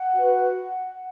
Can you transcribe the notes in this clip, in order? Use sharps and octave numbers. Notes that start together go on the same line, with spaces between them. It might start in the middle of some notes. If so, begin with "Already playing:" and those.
Already playing: F#5
F#4 B4